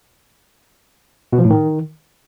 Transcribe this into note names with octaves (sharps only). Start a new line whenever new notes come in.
B2
F3
A2
D#3